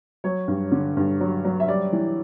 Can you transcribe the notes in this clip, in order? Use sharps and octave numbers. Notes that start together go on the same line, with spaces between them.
F#3 C#5
G2
D3
G2
F#3
F#3
E5
G3 D5
E3